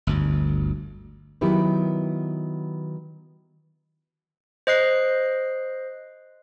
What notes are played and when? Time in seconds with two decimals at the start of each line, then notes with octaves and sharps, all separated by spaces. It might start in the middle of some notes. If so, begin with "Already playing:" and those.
0.07 G1 D2
1.41 D#3 F#3 B3 E4 G4 B4
4.67 C5 D#5 F#6 C7